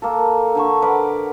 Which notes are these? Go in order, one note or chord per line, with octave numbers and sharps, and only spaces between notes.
A#3 A4
D3 A4 C#6
A#4 B4 D5 F#5